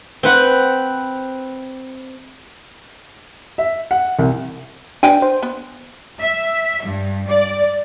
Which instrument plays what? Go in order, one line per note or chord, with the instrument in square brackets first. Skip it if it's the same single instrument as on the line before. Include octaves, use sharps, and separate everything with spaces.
[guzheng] C4 B4 F#5
[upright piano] E5
F#5
C2
[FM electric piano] D4 [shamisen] B4 G5 G#5
[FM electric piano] C5
[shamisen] B3
[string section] E5
G2
D5